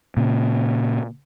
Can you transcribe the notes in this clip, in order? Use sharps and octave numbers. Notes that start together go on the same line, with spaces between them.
A#2 C#3